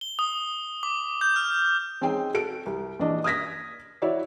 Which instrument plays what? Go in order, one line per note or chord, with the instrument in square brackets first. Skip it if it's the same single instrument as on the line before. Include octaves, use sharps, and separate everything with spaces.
[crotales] G7
D#6
D6
G6
F6
[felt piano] G#3 C4 C#4 D#4 G#4 G5
F#4 A4 D7
C2
A#1 E3 D4 D#5
D#6 F6 G#6 A#6 B6
E4 F#4 C#5 D5 E5